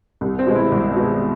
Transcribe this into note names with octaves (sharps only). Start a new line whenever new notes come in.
C2
C4
B2 G#3
E4
C2
B2 G#3